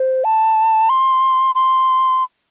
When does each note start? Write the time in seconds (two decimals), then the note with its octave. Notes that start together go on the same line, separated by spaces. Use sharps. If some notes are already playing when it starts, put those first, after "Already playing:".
Already playing: C5
0.24 A5
0.89 C6
1.55 C6